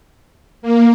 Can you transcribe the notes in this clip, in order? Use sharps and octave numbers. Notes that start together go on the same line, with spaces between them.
A#3